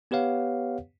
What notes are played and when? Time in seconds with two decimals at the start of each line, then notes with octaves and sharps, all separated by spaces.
0.11 B3 G4 B4 C#5 F5 F#5